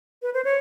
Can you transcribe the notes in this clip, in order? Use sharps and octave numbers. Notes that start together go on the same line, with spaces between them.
B4
C5
C#5